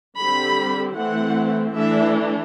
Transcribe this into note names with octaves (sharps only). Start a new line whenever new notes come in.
D3 G3 C4 B5
E3 A3 C4 F#5
E3 A3 D4 E5